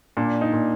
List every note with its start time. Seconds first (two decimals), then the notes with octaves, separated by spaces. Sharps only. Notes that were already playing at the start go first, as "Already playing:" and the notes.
0.17 A#2 D4
0.41 D#4
0.53 A#2